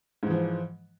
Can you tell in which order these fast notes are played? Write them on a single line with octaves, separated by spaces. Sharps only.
G#2 E3 F3